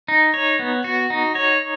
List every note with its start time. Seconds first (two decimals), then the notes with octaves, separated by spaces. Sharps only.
0.08 D#4
0.34 C#5
0.59 B3
0.84 F#4
1.10 D#4
1.35 C#5